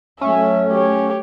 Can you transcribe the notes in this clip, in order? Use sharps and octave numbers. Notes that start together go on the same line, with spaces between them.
F#3 A3 C#4 E5
G4 C#5